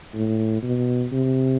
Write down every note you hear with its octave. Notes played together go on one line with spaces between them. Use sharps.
A2
B2
C3